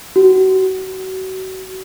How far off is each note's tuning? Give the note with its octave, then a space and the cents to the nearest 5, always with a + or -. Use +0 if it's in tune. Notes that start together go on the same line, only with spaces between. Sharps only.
F#4 +30